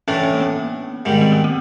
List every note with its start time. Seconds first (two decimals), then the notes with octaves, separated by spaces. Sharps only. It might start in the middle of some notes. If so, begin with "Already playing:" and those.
0.08 A2 E3 A3 C#4 D4
0.23 C#4
0.34 A#3
0.40 B3
1.05 G#2 D#3 G3
1.21 C4
1.32 B3
1.44 A#3